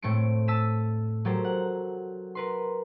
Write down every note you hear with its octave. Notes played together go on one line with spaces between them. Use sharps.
A2 A3 C4 C#7 D7
A5 E6 A6 B6 D#7 E7
F#3 G4 A4 A#4 C5
F#5
A#4 B4 C6